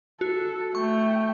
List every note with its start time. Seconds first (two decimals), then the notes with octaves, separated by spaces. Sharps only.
0.21 F#4 A4
0.75 A3 G5 C#6